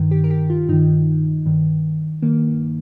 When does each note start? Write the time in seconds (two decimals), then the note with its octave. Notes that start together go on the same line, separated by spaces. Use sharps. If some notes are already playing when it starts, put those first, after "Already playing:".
Already playing: G2 D#3
0.11 G4
0.24 A#4
0.30 G4
0.50 F4
0.69 G2 D#3 D#4
1.46 G2 D#3
2.22 G2 D#3 A#3